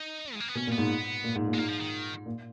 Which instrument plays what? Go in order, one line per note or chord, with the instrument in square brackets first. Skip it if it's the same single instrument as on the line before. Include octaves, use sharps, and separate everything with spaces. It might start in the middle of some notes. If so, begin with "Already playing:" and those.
Already playing: [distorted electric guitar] D#4
G#3
A#3
B3
[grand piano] B2 [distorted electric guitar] C#4
[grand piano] A#2
[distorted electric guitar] B3
[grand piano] G#2
A#2
G#2
A#2
[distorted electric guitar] G#3
[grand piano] G#2 [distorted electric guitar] A#3
[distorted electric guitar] F3
D#3
[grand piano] A#2